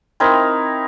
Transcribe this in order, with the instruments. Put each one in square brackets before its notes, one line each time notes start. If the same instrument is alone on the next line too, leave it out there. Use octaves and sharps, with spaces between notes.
[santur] C4 D#4 E4 A#4